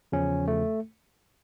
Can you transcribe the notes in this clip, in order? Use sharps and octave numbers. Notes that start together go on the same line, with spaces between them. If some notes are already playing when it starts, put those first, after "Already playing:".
E2 C#3 F3 C#4
A3